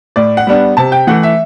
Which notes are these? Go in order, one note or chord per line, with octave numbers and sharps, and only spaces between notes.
A2 D5
F#5
G3 B3 D4
C3 A5
G5
E3 A3 F#5
E5